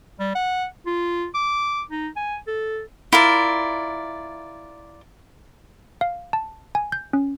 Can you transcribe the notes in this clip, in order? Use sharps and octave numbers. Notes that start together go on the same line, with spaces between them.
G3
F#5
F4
D6
D#4
G#5
A4
E4 F4 A#4 D5
F5
A5
G#5
G6
C#4